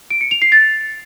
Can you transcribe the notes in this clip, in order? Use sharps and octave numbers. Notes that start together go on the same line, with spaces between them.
D7
C#7
F7
C7
A6